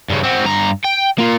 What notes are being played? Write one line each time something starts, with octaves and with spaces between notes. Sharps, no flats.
G2 C#3
C4 F#4
G2 A#5
G5
A#3 F4